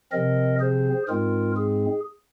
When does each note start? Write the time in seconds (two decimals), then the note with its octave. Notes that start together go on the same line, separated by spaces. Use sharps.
0.12 C3 F3 C4 A#4 D#5
0.60 G#4 C5
1.08 G#2 G#3 C4 F4 A#4
1.57 G#4